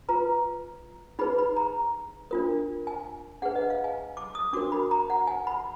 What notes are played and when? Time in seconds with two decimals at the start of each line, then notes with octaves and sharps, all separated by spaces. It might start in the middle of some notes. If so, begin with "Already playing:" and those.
0.09 F4 B4 A#5
1.19 D#4 G#4 B4 B5
1.39 B5
1.56 A#5
2.31 D4 F4 A#4
2.87 G#5
3.42 D4 G#4 B4 F#5
3.55 D#5
3.70 F5
3.84 G#5
4.17 D6
4.35 D#6
4.53 D4 F#4 A#4 D6
4.72 B5
4.91 A#5
5.10 F#5
5.27 G#5
5.47 B5